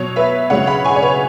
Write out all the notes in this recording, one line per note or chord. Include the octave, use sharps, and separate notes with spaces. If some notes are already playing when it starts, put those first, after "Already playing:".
Already playing: B2 F#3 C#5
B4 E5
C#3 F#3 C#5 F#5
F#5 B5
G#5 C#6
C#5
B4